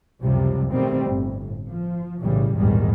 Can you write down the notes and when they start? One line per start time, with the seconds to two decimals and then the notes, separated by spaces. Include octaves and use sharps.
0.23 C#2 F#2 C3 F3 G3
0.72 B2 D#3 G3 A3 C4
1.08 G1 A2
1.69 F3
2.20 B1 A2 C#3 E3 G3
2.55 A#1 E2 G#2 D#3 G3 G#3